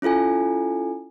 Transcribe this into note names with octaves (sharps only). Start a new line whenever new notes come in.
C#4 E4 F4 A4 G#5